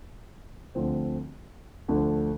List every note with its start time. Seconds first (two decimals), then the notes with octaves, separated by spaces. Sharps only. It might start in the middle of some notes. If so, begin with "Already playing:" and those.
0.75 D2 D3 F3 C4
1.88 D2 D3 F3 A3 D4